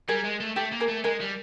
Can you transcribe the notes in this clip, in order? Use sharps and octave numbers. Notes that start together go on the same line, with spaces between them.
G3 G#4 A#4
G#3
A3
A3 G4 A4
A#3
G#4 A#4
A3
G#3 G#4 A#4
G3